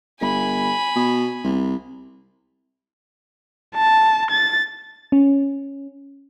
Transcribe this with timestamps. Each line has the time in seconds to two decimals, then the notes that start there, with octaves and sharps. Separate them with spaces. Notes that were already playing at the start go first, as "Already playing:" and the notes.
0.21 G1 G#5 B5
0.96 B2
1.44 C2
3.75 A5
4.31 A6
5.12 C#4